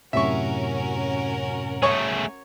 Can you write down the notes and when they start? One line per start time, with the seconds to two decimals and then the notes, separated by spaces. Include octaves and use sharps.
0.13 F#2 A2 C3 C#4 F#4 A#4 E5 C#6
1.83 A3 G#4 C#5 C#6